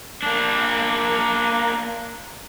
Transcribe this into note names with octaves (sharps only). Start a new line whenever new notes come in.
A#3 D4